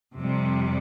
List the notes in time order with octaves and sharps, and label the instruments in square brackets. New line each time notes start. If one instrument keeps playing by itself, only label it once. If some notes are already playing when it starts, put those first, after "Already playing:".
[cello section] F2 C3 G3